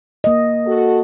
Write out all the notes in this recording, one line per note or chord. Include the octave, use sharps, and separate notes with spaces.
A#3 D#5
F#4 A4